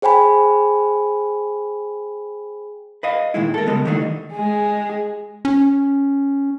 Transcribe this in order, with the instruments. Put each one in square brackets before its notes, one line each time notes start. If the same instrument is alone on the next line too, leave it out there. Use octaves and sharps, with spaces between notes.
[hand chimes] G#4 C5 G5 G#5 B5
[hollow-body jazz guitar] B4 D#5 F5
A#2 D#3 G#3 E4
A4 A#4
C#3 G3 G#3 B3
D#3 E3 A3 D4 D#4
[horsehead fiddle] G#3 G#4
[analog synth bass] C#4